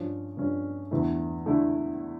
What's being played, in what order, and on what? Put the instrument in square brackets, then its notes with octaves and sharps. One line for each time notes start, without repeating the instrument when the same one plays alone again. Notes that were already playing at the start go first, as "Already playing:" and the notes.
Already playing: [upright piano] G2 F3 C#4
G2 F3 C#4
E2 D3 A3 E4
D3 A3 E4